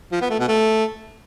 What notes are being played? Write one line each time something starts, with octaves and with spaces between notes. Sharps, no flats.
F3
B3
A3
B2
A3